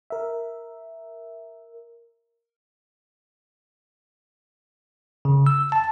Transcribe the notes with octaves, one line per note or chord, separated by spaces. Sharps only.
A#4 E5
C#3
E6
A5